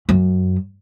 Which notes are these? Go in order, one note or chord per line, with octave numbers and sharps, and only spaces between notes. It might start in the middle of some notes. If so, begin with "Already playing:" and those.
F#2